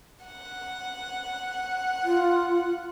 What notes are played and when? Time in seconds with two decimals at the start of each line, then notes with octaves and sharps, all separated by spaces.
0.25 F#5
2.04 F4